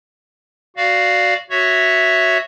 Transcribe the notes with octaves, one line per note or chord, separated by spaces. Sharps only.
F#4 D5 F5
F#4 C#5 E5